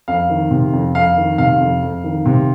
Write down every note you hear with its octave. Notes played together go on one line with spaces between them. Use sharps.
F2 F5
D#3
C3
F2
F2 F5
D#3
C3 F5
F2
F2
D#3
C3